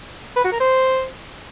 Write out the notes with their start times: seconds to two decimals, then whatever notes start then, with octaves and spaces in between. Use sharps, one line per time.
0.36 B4
0.44 F#4
0.52 A#4
0.60 C5